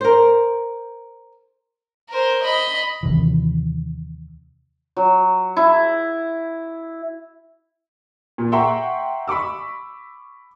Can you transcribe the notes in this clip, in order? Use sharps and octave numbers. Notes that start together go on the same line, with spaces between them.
A#4 C5
A#4 C5
D#5 B5
D#2 C3 E3
F#3
E4
A#2
E5 F#5 G5 A#5 C6 C#6
B5 C#6 D6 E6